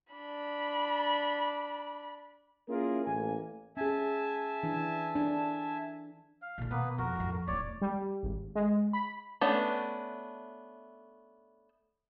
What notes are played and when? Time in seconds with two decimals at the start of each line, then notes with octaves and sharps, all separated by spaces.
0.13 D4 B5
2.69 A#3 C#4 E4 F4 G#4 A#4
3.06 A1 A#3 G#5
3.77 C#4 G#4 E5 G#5 A5
4.63 E3 D4
5.15 D4
6.42 F5
6.58 A#2 D3
6.71 B2 A#3 B3 B4
6.98 F2 F#4 A#4
7.16 A1 F2
7.47 D1 E2 C#5 D5
7.82 G3
8.23 G#1
8.55 G#3
8.93 B5
9.41 A3 B3 C#4 D4